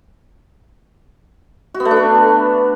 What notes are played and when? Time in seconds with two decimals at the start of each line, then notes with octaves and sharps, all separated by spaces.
1.74 F#4
1.80 B3
1.85 A3
1.91 D4
1.96 B4